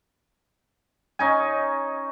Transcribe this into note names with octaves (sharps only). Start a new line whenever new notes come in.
C#4 D#4 G#5